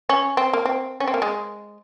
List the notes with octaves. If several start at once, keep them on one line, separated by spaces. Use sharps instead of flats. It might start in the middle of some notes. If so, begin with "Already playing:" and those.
C#4
C4
A#3
C4
C#4
C4
A#3
G#3